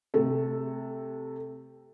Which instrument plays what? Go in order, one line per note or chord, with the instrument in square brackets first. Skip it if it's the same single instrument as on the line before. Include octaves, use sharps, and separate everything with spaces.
[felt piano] C3 A3 A4